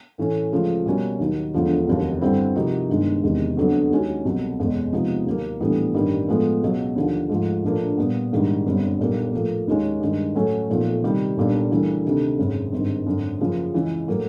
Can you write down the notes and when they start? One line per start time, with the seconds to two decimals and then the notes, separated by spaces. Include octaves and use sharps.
0.18 A2 E3 A3 C#4
0.52 C#2 C#3 F3 A3
0.86 B2 G3 A#3 C#4 F#4
1.20 D#2 D#3 F#3
1.53 E1 D2 D3 F3 A3
1.87 F1 D#2 D#3 F#3
2.21 G2 D3 G3 C4 E4
2.55 C3 F3 A#3 D#4 F#4
2.89 G1 G2 D#3 G#3
3.23 E1 E2 C3 D#3 G#3
3.57 F2 D3 F#3 B3 D4
3.91 D#2 D#3 G#3 C#4 F#4
4.25 C2 B2 F#3
4.59 F#1 E2 B2 G#3 C#4
4.92 C3 F3 G#3 B3 D#4
5.27 D#2 D#3 F#3 A#3
5.60 A#1 A2 E3 G3 B3
5.94 A1 G2 D#3 G3 A#3
6.28 A2 F3 G#3 B3
6.63 C#2 B2 F#3
6.96 D#2 D3 F3
7.29 G#2 F3 A3
7.64 A#1 A2 F3 A#3 D4
7.98 A#2 G3 B3
8.32 A#1 G#2 D#3 G3
8.66 G1 F#2 D3 G3 C4
9.00 B1 A#2 G3 A#3
9.33 A2 F3 A#3
9.68 D#2 D#3 G#3 C#4
10.01 G2 D#3 G#3
10.35 A2 F#3 A3 C#4
10.69 B1 A#2 F3 A3
11.03 C3 D#3 G3
11.36 B1 A#2 G3 A#3 D4
11.71 D2 C#3 E3 G3 A#3
12.05 D2 C3 D#3
12.38 G#1 F#2 C#3
12.72 G#1 G2 D#3
13.06 G#1 F#2 D3
13.41 F#1 F#2 C#3 F3 A#3
13.74 C#2 C#3 E3 G#3
14.08 A2 F#3 A#3